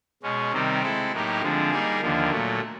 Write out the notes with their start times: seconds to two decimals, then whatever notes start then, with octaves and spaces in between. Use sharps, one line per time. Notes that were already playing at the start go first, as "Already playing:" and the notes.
0.23 B2 G#3 C#4
0.52 C3 D#3 G3 C4 D#4
0.82 G#3 C4 E4 A4
1.12 A2 F#3 A#3 D#4 G4
1.42 D3 F3 G#3 C4
1.71 G3 A#3 D#4 G#4
2.01 D#2 D3 F3 A#3
2.30 A#2 F#3 A3